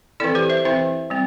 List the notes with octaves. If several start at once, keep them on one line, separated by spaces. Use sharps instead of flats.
E3 C4 E4 A4 D5
G4 C5
C5 E5
E3 C4 E4 C5 E5
G3 C4